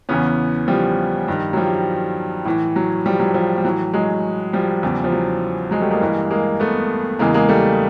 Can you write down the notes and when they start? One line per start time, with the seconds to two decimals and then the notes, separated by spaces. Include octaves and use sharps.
0.09 E2 C#3 E3 B3 C#4
0.68 F3 G3
1.28 G2 D#3
1.53 F#3
1.57 F3 G3
2.45 A2 E3
2.76 F#3
3.06 F3 G3
3.20 F#3
3.34 F3
3.57 G3
3.65 A2 E3 F#3
3.94 F#3 G#3
4.53 F3 G3
4.83 E2 C#3 E3
5.04 F3
5.12 F#3
5.71 F#3 G#3
5.82 G3 A3
5.91 G#3 A#3
6.01 G2 E3
6.30 G#3 A#3
6.60 A3 B3
7.19 E2 C#3 E3 G#3 A#3
7.34 G#3 A#3
7.49 G3 A3